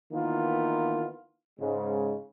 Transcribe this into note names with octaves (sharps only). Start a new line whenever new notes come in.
D#3 E3 A#3 B3 D#4 F4
G#2 C#3 G#3